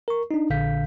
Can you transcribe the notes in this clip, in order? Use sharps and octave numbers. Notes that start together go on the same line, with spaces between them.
A#4 C#6
D4 D#4
A#1 A#2 D3 F5 G6 B6